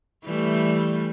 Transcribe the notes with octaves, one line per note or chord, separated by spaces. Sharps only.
E3 G3 A3